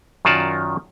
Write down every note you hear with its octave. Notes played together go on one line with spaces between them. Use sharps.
F#2 D#3 F4 F#4 D5 A5